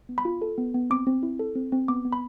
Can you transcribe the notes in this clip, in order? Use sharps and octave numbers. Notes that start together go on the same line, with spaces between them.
B3
B5
F4
A4
B3
B3
C4 D6
C4
E4
A4
C4
C4
B3 D6
B3
B5